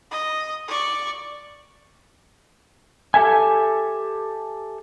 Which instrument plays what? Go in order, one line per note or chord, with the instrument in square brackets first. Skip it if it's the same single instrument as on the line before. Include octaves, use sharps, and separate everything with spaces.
[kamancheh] D#5
D5 C#6
[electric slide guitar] G4 A4 E5 G#5